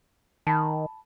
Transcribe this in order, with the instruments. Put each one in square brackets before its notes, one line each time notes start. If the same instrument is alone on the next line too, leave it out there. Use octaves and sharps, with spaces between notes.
[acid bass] D#3 [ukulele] A5 B5